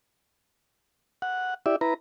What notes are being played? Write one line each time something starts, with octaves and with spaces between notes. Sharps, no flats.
F#5
E4 G4 D5 E5
E4 B4 A#5